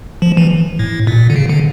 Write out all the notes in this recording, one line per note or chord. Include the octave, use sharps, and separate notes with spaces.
F3
E3
A2
A#2
D3
C#3
D3